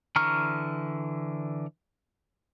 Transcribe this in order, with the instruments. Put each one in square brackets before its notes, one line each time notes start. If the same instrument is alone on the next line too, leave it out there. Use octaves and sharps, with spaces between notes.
[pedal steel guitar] D3 E3 A#5 C#6 F6